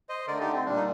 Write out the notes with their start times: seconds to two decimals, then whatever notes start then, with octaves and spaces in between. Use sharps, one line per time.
0.09 C5 D#5
0.27 D3 A3 A#4 D5
0.40 D#4 G4
0.53 C4
0.65 A#2 G3 D4
0.76 D#4